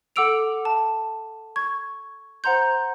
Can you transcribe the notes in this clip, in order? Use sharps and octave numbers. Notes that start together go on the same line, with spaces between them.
A4 F#5 D6 E6 D7 F7
A5
C#6 G#6
C5 F#5 A#5 C6 G6